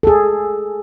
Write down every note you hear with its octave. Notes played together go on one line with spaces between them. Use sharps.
G#4 A4